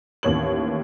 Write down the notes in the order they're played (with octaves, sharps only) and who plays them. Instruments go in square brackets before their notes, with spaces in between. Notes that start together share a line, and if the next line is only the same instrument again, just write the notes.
[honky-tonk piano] A1 D#2 C#5 F#7